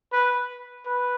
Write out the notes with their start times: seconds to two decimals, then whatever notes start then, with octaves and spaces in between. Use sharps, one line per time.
0.12 B4
0.86 B4